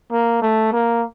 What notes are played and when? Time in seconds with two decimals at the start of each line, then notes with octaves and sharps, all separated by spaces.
0.12 A#3
0.42 A3
0.72 A#3